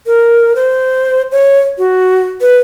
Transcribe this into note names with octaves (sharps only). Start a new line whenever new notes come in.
A#4
C5
C#5
F#4
B4